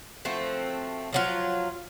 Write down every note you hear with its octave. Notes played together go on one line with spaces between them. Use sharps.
F3 A3 C4 F#4
F3 F#3 F4